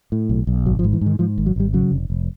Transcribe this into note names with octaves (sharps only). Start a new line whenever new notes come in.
A2
B1
B1
G#1 F#3
F3
G#2
E3
G#2
D#3
G#2 F3
G#1
F#3
G#1 G3
C#3 F#3
F1
F1